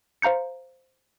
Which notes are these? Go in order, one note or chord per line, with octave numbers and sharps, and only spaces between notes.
C5 F5 A#5 G6 C#7